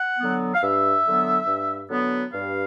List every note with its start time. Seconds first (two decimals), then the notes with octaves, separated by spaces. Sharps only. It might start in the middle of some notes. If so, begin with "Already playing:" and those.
Already playing: F#5
0.19 D3 F#3 B3
0.54 F5
0.62 G2 E5
1.05 D3 F#3 B3
1.47 G2
1.89 D3 F#3 B3
2.33 G2 F5